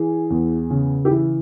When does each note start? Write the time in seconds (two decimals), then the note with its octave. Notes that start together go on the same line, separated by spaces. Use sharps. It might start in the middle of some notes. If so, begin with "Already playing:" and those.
Already playing: E3 G#4
0.30 E2
0.70 C#3
1.05 G4
1.11 E3 E4